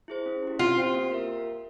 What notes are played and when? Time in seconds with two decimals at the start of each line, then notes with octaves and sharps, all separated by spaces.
0.08 E4 G#4 C5
0.26 C#4
0.42 E4
0.47 G4
0.59 C4 F4
0.77 G4 C5 G5
0.94 A#3
1.11 F4 A#4 E5